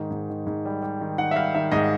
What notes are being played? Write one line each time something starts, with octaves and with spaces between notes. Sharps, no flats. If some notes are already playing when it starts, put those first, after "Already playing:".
Already playing: G#2 D#3
G#2
D#3
G#2
G3
G3
D#3
D#3 F#5
E5
G3 F5
D#3 E5
G#2 D#5